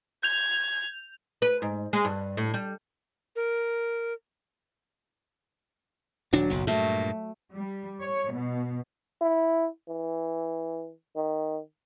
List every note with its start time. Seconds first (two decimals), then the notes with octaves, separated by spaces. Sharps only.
0.23 G6 G#6 F7
1.42 B4
1.62 G#2
1.93 G#3
2.05 G2
2.37 A2
2.54 G3
3.36 A#4
6.33 D#1 F#3 D4
6.50 F#1 B1
6.67 G2 A#2 A3
7.53 G3
8.02 C#5
8.33 B2
9.21 E4
9.89 E3
11.16 D#3